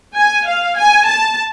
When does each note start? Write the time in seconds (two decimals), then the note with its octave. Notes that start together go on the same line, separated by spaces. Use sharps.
0.17 G#5
0.48 F5
0.77 G#5
1.07 A5